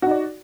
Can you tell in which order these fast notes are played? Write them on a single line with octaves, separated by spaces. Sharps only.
F#4 D#4 D5